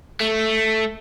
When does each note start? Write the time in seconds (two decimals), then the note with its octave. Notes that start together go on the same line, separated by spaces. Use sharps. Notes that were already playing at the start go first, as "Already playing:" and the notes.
0.21 A3